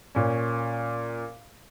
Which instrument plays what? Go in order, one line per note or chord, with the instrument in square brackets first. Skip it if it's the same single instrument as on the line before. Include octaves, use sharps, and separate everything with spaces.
[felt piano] A#2 C#4